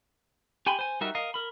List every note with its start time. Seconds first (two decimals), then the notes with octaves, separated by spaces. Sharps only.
0.66 G4 G5 G#5 B5 C6
0.79 C5 G#5
1.01 G3 D#4 F#4 A#4 E5
1.15 A#4 D#5 F5
1.34 A#4 B5